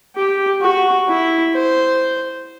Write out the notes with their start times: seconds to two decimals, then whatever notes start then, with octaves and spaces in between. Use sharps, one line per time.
0.16 G4
0.61 F#4
1.08 E4
1.54 C5